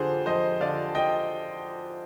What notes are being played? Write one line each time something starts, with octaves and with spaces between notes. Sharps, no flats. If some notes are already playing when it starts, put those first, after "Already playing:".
Already playing: F2 D3 F3 G4 G#4 C5
F2 C5 D#5
D3 F3 D5 F5
D#5 G5